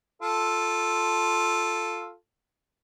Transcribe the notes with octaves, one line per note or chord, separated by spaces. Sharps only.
F4 A4